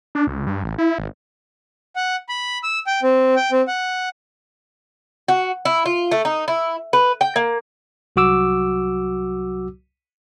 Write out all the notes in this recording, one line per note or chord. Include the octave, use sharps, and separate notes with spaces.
D4
C#2
G2
A1
E4
G#1
F#5
B5
E6
G5
C4
G5
C4
F#5
F#4
E4
F4
A3
D#4
E4
B4
G5
A#3
C2 F#3 F#4 D6 E6